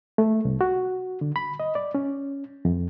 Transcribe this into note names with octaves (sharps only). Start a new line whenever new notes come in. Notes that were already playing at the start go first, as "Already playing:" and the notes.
A3
C2
F#4
D3
B5
D#5
D5
C#4
F2